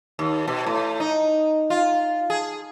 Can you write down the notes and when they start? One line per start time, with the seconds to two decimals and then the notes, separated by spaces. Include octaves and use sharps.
0.19 D#2
0.48 B2
0.66 A2
1.00 D#4
1.70 F4
2.30 G#4